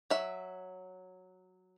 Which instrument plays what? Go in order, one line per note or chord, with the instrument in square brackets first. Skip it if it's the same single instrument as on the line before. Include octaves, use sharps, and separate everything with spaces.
[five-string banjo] F#3 E5